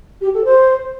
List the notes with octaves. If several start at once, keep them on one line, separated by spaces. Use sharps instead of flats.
G4
A4
C5